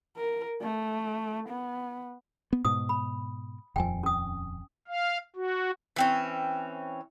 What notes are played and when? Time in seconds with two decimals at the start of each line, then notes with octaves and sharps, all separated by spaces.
0.17 A#4
0.61 A3
1.48 B3
2.53 B3
2.65 G#2 B2 D#6
2.89 B5
3.76 D#1 F2 G5 G#5
4.03 C#4 D#6
4.88 F5
5.36 F#4
5.96 E3 C4 C#4